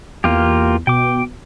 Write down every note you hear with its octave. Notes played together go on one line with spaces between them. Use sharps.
E2 A#3 F4 G4
B2 G5 D6